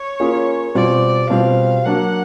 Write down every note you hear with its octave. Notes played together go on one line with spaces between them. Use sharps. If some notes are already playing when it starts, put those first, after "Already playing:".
Already playing: C#5
A#3 C#4 F4 G#4
B2 G3 C4 F4 D5
B2 G3 C4 F4 F5
F#3 A#3 D4 F#5